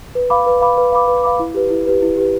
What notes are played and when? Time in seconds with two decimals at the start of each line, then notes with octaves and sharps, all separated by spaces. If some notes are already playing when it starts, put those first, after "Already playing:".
0.15 B4
0.30 F5 B5 D6
0.46 B4
0.61 F5 B5 D6
0.78 B4
0.92 F5 B5 D6
1.08 B4
1.24 F5 B5 D6
1.39 E4
1.54 G4 B4
1.70 E4
1.86 G4 B4
2.02 E4
2.17 G4 B4